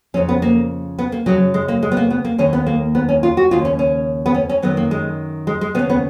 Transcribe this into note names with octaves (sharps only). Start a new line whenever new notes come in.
F2 C#3 C#4
B3
A#3
B3
A#3
F#2 C#3 F#3
G#3
A#3
G#3
B3
A#3
B3
A#3
D#2 D#3 C#4
B3
A#3
B3
C#4
F4
F#4
D#2 C#3 F4
C#4
C#4
B3
C#4
C#4
F#2 D#3 B3
A#3
G#3
G#3
G#3
D#2 C#3 B3
B3